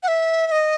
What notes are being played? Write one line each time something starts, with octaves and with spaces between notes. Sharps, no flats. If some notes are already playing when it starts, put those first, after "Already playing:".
F#5
E5
E5
D#5